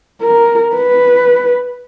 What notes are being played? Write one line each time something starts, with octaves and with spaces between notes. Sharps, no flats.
A#4
B4